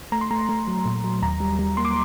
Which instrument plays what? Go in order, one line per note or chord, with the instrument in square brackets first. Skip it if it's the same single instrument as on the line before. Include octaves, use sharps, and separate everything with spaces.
[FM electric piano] A3 A#5
C6
A3 A#5
A3
F#3
A#2
F#3
D#2 A#5
G3
G3
A#3 C6
D6